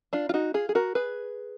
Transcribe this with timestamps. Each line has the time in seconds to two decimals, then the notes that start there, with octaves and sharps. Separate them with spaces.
0.13 D4 F4
0.29 F4
0.34 D#4 F#4
0.54 F4 G#4
0.69 G#4
0.75 F#4 A#4
0.95 G#4 B4